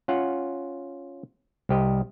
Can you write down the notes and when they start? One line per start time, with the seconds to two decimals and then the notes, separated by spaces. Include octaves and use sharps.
0.08 C#4 F4 F#5
1.69 C2 G4 D#5